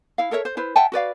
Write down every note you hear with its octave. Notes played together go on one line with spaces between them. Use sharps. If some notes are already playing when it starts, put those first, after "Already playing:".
E4 F5
A4 A#4 C#5 E5
C5
E4 B4 C5
E5 F#5 G5 A5
F#4 B4 D5 F5